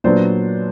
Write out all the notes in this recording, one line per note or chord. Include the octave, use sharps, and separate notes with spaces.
A#2 F#3 B3 D4 C5 D5